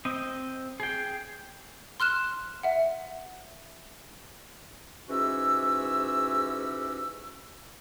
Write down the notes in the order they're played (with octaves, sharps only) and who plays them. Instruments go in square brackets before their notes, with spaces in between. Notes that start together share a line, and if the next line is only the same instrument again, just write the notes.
[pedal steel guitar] C4 D#5
G#4 G5
[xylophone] C6 F6 F#6 E7
E5 F#5
[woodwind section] G#2 E3 C#4 F#4 G4 E6